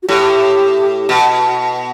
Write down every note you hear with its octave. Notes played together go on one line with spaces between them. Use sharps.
F#4
A2 G4
B2